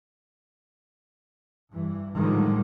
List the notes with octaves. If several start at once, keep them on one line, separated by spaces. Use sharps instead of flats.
G2 E3
A2 D3 D#3 F3 G3 G#3